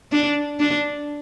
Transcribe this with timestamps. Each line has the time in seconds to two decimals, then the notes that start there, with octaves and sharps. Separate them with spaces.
0.12 D4
0.60 D4